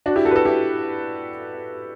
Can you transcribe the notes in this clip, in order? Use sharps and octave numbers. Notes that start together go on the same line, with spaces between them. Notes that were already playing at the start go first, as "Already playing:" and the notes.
D4 F#4
E4 G4
F#4 A4
B4
F#4 A4
E4 G4